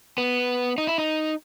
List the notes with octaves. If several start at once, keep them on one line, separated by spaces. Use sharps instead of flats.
B3
D#4
E4
D#4